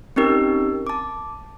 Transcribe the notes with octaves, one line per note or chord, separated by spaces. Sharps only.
C4 C#4 D#4 G4 A#4
A5 D6